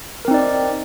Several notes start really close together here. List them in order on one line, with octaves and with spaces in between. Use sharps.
A#4 C4 D#4 D5